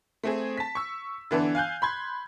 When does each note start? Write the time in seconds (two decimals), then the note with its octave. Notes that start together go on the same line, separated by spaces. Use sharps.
0.23 A3 C4 G#4
0.57 A5 B6
0.75 C#6 E6
1.31 D3 E3 B3 D4
1.55 F5 G#5 F#6 G6
1.82 B5 C6 G#6